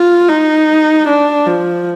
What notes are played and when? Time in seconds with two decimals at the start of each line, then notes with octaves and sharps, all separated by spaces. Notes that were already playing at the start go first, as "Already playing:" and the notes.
Already playing: F4
0.29 D#4
1.08 D4
1.47 F3